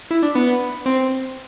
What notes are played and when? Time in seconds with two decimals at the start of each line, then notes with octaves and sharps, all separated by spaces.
0.11 E4
0.23 D4
0.35 B3
0.86 C4